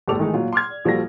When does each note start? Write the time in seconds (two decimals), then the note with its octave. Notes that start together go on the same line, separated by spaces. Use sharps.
0.08 G1 A2 G3 A4 D6 F7
0.19 D#3 E3 G#3 A3 D#4
0.34 A#2 F#3 F4 F5
0.53 C6 D6 F6 G#6
0.70 D5
0.85 A#1 F3 G3 F#4 A4 A#6